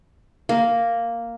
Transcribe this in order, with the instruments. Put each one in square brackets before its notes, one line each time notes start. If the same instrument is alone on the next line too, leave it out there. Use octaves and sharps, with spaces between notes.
[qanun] A#3